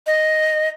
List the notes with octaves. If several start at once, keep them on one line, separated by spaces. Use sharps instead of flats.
D#5